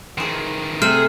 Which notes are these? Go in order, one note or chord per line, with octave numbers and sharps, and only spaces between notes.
D#3 E3 G#4 C5
C3 A3 G#4 C5 F6